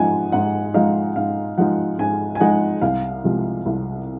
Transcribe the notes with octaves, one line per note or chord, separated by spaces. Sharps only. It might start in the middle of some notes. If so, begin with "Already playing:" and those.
Already playing: G#2 F3 G#3 D#4 F#5 G#5
G#2 F#5
F3 G#3 D#4 F5
G#2 F5
F3 G#3 D#4 F#5
G#2 G#5
G#5
F3 G#3 D#4 F#5
C2 F5
C3 F3 G#3
C2